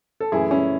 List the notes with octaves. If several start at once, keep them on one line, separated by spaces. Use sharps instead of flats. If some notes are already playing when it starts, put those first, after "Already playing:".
A4
F#2 E3 A3 E4 G#4
C#4 E4